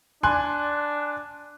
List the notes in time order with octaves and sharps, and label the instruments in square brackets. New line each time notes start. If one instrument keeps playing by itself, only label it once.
[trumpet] D4 [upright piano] G#5 C6 F#6